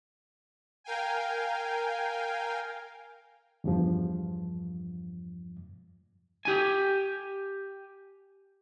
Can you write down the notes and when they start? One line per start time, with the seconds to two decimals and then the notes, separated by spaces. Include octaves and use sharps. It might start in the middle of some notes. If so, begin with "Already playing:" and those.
0.84 A#4 F5 G5 G#5
3.64 E2 G2 F3
6.45 G4 G#5